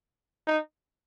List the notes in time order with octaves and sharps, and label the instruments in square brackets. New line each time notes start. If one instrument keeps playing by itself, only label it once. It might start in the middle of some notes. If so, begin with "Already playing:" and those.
[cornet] D#4